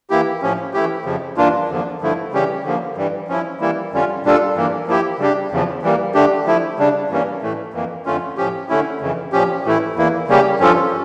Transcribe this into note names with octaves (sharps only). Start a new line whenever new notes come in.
E3 A#3 E4 G4
A2 F3 C#4
E3 A3 E4 G4
F2 C#3 F3
G2 E3 A#3 D4 F4
E2 D3 F3 A#3
G2 D3 F3 A3 E4
C#3 E3 G3 C#4 G4
D3 F3 A#3
G2 E3 G3
F3 C#4 E4
E3 G3 A#3 E4
F2 D3 G3 C#4 F4
A#2 G3 D4 F4 A4
G2 E3 A#3
F3 A#3 E4 G4
C#3 G3 D4 G4
E2 C#3 F3
E3 G3 A#3
D3 A3 D4 G4
F3 A3 E4
C#3 G3 D4
G2 E3 G3 A#3 C#4
A2 E3 A3
F2 E3 A#3
F2 D3 A3 C#4 F4
A2 F3 C#4 G4
D3 A3 C#4 E4
F2 C#3 E3
A#2 F3 C#4 G4
A2 E3 A3 E4
E2 E3 A#3 E4
C#3 G3 A#3 C#4 G4
G2 F3 C#4 F4 A4